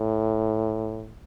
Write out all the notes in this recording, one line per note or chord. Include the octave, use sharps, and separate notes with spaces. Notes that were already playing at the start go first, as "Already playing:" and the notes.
Already playing: A2